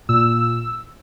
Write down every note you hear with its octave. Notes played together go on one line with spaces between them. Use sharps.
A#2 E6